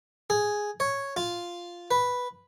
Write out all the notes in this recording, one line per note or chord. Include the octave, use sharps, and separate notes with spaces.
G#4
C#5
F4
B4